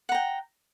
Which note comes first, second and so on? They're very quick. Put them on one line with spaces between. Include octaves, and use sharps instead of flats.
F#5 A#5 G5